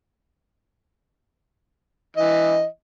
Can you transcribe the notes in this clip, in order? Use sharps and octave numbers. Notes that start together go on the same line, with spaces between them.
E3 D#5